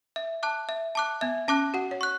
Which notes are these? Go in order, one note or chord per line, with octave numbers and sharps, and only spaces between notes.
E5
A5 D6 F#6
E5
A5 D6 F#6
B3 E5
C#4 A5 D6 F#6
F#4 F#5
C#5
C#6 F#6